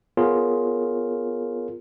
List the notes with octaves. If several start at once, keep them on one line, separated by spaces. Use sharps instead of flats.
B3 F4 G#4 A#4 C#5